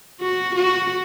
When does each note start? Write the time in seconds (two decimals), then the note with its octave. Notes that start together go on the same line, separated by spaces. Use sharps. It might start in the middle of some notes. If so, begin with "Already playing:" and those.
0.20 F#4
0.55 F#4